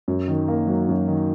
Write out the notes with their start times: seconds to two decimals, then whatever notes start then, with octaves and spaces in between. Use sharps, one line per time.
0.08 F#2
0.28 D#3
0.48 A#3
0.67 F#3
0.89 F#2
1.08 D#3